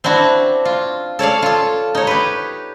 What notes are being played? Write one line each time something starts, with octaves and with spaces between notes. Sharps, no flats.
C4 D4 E4 F#4
F4
A4 C#5 D5 F5
F4 A4
D#4 C#5
G4 B4